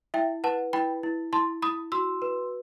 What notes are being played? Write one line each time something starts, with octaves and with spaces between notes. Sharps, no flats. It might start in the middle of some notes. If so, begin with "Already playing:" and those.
E4 E5 G5
B4 F#5 A5
E4 G5 B5
E4
E4 A5 C6
E4 B5 D#6
F#4 C6 E6
B4